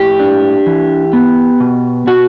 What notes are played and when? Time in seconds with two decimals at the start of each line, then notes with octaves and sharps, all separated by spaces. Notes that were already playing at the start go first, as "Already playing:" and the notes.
Already playing: A2 G4
0.20 D4
0.66 E3
1.13 B3
1.60 B2
2.07 B2 F#4